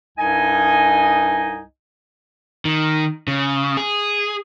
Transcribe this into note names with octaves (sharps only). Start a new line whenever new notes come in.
C2 G2 D#4 D#5 G#5
D#3
C#3
G#4